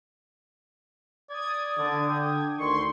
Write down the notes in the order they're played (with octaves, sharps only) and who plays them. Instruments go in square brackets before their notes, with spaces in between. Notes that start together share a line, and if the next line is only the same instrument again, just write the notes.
[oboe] D5 [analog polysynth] D#6 G#6
[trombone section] D3 [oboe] D5
[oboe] G5
[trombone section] D2 D3 D#3 [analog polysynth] C6 [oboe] C#6